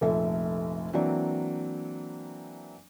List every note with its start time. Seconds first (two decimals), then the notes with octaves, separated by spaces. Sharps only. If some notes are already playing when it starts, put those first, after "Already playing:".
0.01 F1 A#1 A3 E5
0.93 E3 F#3 A#3 C4 D4